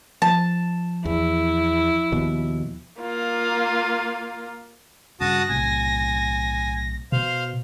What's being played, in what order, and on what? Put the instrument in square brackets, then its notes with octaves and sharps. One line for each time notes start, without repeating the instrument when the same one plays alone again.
[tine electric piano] F3 [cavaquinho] A5
[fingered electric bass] E2 [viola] E4
[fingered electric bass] D#2 B2
[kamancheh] A#3 F4
[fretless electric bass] G2 C#3 [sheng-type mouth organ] F#4 A5 D#6 [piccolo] A#6
[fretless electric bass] B1 A2 C3 [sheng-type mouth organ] G#5
[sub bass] B2 [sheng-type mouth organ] C5 F5 [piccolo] F7